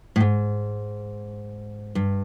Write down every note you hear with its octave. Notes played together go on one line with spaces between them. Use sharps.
A2
G#2
G2